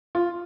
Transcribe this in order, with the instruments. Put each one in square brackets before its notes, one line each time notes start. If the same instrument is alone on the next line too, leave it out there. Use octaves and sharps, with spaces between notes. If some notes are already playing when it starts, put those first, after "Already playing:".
[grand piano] F4